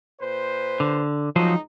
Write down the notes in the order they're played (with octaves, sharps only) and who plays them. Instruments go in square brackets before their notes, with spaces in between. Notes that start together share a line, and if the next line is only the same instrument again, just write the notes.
[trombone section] A#2 B4 C5
[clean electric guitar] D3
[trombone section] C#2 D#4 [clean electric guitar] F3 F#3 C5